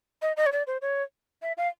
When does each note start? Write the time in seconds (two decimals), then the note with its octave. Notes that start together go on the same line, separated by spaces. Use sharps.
0.22 D#5
0.37 D#5
0.46 C#5
0.52 D5
0.67 C5
0.82 C#5
1.42 E5
1.57 F5